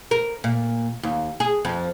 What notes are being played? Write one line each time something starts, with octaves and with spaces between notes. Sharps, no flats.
A#4
A#2
D#2
G#4
F2